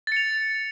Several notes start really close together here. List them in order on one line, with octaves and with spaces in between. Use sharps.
A6 C#7 F7